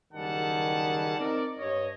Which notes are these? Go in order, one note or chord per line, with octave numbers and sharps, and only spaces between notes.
F#1 D#3 G3 G#4 F#5 A5
C4 D#4 A#4 D5
G2 C#5 D#5